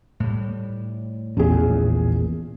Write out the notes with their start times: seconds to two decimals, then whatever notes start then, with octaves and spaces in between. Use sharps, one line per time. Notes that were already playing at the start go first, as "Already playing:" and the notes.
0.20 A2 G3
1.37 A#1 E2 C#4 G#4